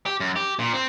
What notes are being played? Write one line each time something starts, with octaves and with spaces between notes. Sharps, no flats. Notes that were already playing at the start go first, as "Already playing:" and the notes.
G4
F#2
G4
A#2
C4